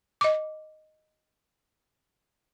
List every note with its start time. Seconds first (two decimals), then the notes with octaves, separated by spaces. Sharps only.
0.21 D#5 D6